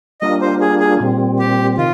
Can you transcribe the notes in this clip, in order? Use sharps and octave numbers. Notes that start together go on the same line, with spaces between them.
G3 A#3 D4 F4 D#5
C5
G#4
G#4
A#2 G3 C4
G4
C3 D#3 F4